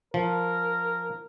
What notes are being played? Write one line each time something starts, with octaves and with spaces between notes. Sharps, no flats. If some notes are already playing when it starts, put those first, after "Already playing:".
F3 A#4